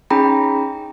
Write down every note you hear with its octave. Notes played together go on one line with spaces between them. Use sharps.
C#4 D#4 G#4 G5 A#5 B5